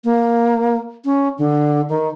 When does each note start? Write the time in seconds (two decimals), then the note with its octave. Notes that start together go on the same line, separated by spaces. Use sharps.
0.04 A#3
1.05 C#4
1.38 D3
1.89 D#3